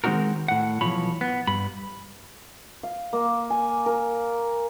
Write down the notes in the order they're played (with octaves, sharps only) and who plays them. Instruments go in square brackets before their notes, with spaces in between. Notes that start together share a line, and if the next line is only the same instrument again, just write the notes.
[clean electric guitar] D#3 G#3 C4 D#4 F#4 A#4
A2 F#5
B1 E3 F3 C#5 B5
B3
G2 B5
[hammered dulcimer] F5
A#3
G#5
A#4